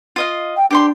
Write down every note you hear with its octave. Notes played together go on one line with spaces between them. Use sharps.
F4 D#5 F5
G5
D4 G4 C5 C6